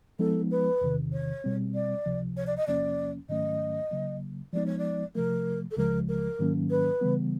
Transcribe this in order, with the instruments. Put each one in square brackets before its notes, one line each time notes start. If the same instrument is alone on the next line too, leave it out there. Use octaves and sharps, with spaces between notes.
[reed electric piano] F3 G#3 B3 D#4 [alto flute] A4
[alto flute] B4
[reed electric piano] E2 C3 D#3
[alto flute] C#5
[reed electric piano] B2 G3 C4
[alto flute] D5
[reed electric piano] C#2 C3 F3
[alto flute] C#5
D5
D#5
[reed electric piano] E2 C3 F3 A#3 C#4 [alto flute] D5
[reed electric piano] G#2 D#3 F#3 A3 C#4 [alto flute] D#5
[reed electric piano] C#3 F#3 A#3
[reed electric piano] F3 G#3 B3 D#4 [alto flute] D5
[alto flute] C#5
D5
[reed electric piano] C3 F3 A3 [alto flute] A#4
[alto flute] A4
[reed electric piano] C#2 C#3 F3 G#3 [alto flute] A#4
[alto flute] A#4
[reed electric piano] G#2 D#3 F#3 A#3 C#4
[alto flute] B4
[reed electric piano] C#3 E3 G3 B3